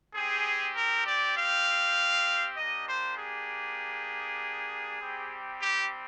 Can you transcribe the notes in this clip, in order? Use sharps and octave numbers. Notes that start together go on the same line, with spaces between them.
C4 G4 G#4
A#4
D5
F5
A#3 D4 G4 D#5
C5
G#4
G3 C4 G4
G4